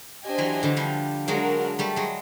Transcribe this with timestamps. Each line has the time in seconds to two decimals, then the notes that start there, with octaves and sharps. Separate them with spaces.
0.24 D4 G4 C5 D#5 G#5
0.38 E3 F#3
0.63 D3 E3
0.77 F3 G3
1.28 F#3 G#3 D4 F#4 A#4
1.79 G3 A3
1.96 F#3 G#3